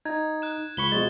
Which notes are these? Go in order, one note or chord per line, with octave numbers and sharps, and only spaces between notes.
D#4 G#6
F#6 E7
C#2 B5 C#6 G7
B2 F3 G#3 A6